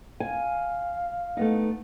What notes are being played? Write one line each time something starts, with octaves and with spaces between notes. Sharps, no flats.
F5 G#5
A3 B3 D#4